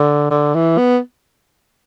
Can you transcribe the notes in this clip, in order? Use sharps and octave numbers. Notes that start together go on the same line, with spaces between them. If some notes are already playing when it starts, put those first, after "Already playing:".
Already playing: D3
D3
E3
B3